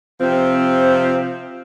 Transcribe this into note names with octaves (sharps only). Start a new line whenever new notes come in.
C3 F3 C4